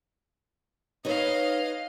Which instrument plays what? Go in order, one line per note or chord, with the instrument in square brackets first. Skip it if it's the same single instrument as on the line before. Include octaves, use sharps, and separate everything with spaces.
[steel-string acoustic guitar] D#4 B4 C#5 [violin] D#5 F5